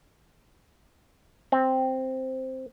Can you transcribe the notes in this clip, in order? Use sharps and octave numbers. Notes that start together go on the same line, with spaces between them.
C4